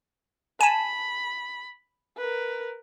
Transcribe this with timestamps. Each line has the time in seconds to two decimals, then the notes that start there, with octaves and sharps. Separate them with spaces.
0.61 G#5 A5 B5
2.17 A#4 B4